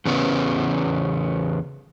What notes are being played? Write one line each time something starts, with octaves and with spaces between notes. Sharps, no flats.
E2 C#3 B3 C#4